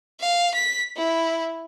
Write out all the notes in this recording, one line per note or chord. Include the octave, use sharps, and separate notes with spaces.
F5
B6
E4